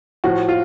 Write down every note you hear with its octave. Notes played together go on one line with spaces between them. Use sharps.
A2 F3 F#4
F4